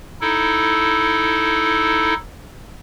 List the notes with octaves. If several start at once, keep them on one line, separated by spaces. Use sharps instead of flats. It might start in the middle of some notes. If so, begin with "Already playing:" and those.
D#4 E4 A4